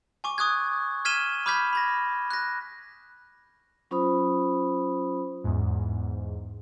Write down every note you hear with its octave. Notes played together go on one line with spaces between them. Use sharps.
G#5 C#6 D6
C#6 D#6 F#6 G#6
F6 G#6 B6 D#7 E7 G7
B5 D6 F6 G6 G#6 B6
B5 G#6 A#6
F#6 A#6
F#3 C#4 F4 C5 B5 D#6
E2 G#2